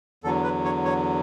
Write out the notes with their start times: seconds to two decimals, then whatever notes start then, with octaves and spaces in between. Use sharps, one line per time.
0.24 E2 D3 F#3 A4
0.43 B4
0.65 C#5
0.85 C#5